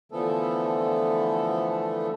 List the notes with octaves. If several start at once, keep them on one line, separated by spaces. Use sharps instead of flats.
D3 E3 F3 A3 B3 A4